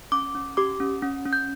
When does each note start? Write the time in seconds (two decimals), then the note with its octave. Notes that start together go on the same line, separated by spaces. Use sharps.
0.12 C#4 D6
0.35 C#4
0.57 G4 D6
0.80 C#4
1.02 C#4
1.25 C#4
1.33 G6